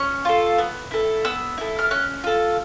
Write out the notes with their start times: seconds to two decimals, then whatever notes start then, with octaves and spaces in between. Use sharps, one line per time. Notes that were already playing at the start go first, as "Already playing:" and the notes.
Already playing: C#4 C#6
0.25 F4 A4
0.58 B3
0.91 E4 A4
1.25 B3 E6
1.58 E4 A4
1.79 F6
1.91 C#4 F#6
2.24 F4 A4